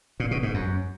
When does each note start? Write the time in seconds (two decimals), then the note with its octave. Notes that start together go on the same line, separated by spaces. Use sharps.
0.20 A#2
0.31 B2
0.43 G#2
0.54 F#2